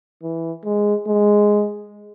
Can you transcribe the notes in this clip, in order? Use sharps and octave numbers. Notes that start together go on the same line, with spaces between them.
E3
G#3
G#3